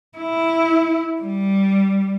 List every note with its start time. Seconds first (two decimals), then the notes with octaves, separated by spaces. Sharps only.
0.18 E4
1.21 G3